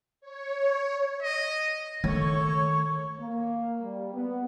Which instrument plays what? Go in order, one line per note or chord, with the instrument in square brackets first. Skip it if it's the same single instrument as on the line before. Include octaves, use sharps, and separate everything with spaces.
[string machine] C#5
[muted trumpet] D#5
[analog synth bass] D#3 [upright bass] A3 [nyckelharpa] A4 C#6 [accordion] C#5
[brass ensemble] A#3
G3
B3